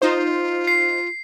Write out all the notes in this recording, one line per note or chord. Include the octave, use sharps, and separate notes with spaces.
D#4 F4 C5
C7